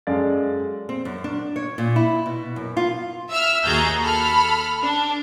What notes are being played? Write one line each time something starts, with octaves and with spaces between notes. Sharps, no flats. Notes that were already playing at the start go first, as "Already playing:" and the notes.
F#2 G#3 A4 D5 F5 A6
C4
F#2
D4
C#5
A#2
E4
B2
F#2
F4
E5 E6 F6
D#2 F#4 G#4 A#5 G6 A6
A4 B5 F6
D4